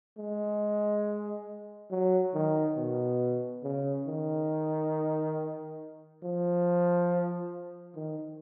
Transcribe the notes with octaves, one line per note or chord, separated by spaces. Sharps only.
G#3
F#3
D#3
B2
C#3
D#3
F3
D#3